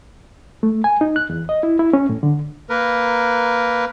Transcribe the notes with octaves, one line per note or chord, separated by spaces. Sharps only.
A3
G#5
D#4
F#6
E2
D#5
E4
E4
C#4
A2
D3
A#3 A#4 B4